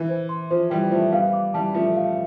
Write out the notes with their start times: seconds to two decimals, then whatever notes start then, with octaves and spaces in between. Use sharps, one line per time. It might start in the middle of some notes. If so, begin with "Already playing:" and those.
Already playing: E3
0.09 C5
0.29 C6
0.51 F3 C5
0.70 E3 G3 G5
0.91 F3 A3 C5
1.12 G3 B3 F5
1.33 D6
1.54 E3 G3 A5
1.74 F3 A3 B4
1.96 F5